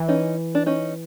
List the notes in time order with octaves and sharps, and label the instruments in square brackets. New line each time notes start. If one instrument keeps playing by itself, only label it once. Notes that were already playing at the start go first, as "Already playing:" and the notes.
Already playing: [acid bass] E3
[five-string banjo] C#4 D#4
D4
C#4 D#4